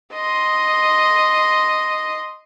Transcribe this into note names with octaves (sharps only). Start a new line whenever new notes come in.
D#5 C6